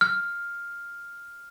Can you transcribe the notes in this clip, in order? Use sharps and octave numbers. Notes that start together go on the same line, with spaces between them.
F6